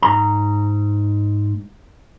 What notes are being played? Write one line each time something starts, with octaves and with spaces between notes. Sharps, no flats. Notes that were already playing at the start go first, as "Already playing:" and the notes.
G#2 A#5